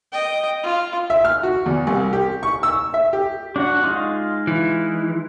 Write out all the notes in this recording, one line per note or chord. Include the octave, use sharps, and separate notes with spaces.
D#5 G5
F4
E5
F6
F#4
E2
C2
G4
C#6
E6
E5
G4
D4 F#4 F#5
G#3 D#4 F4
E3